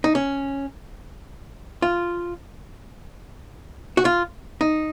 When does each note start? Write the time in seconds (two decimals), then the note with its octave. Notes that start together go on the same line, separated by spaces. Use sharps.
0.04 D#4
0.15 C#4
1.82 F4
3.97 F#4
4.05 F4
4.61 D#4